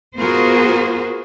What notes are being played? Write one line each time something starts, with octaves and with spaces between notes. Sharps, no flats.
B3 F4 F#4 G#4 A#4 C5